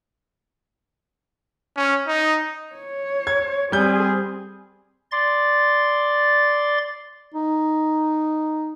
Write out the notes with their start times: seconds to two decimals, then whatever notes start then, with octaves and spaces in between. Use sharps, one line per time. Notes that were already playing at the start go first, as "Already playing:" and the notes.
1.76 C#4
2.08 D#4
2.75 C#5
3.27 G#6
3.72 G3 C4 G#4 G6
5.12 D5 C6 A6
7.34 D#4